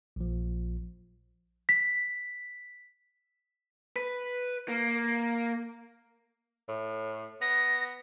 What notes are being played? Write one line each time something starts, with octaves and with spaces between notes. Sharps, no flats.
A#1 F3
B6
B4
A#3
A2
B3 A#6